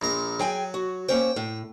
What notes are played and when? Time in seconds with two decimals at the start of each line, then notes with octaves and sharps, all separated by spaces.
0.02 A#1 A#2 A#5
0.40 F#3 G#4 G5 G#5
0.74 F#4
1.09 A#3 C#4 C5 G5
1.36 A2